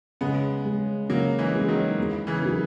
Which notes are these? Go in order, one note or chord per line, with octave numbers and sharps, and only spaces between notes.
C#3 G#3 B3
G#3 C#4
C#3 F#3 A#3
E3 G#3
G#3 C#4
D#3 F#3
E2
C#3 E3
D#3 F#3